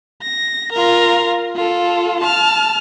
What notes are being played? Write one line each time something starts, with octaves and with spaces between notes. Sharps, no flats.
A#6
F4 A#4
F4 A4
A5 F6